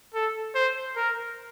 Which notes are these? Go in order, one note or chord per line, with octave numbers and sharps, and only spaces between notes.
A4
C5
A#4